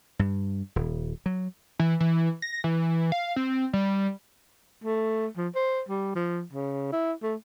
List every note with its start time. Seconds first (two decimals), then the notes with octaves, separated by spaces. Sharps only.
0.19 G2
0.76 D#1
1.26 F#3
1.79 E3
2.00 E3
2.42 A#6
2.64 E3
3.12 F5
3.36 C4
3.73 G3
4.84 A3
5.37 F3
5.55 C5
5.89 G3
6.15 F3
6.53 C#3
6.92 E4
7.23 A3